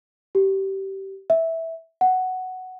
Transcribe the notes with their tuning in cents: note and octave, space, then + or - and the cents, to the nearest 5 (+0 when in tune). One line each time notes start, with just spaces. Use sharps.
G4 -20
E5 -10
F#5 +5